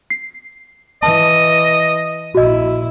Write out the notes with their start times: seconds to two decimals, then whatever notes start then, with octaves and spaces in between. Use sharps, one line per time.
0.10 C7
1.03 E3 D#5 A5
2.35 A#1 E4 F#4 D#5